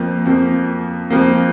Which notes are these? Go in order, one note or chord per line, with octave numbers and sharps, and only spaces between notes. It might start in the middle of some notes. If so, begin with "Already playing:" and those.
Already playing: F2 F3 A#3
F2 F3 A#3
F2 F3 A#3